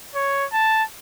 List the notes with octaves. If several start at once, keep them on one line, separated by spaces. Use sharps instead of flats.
C#5
A5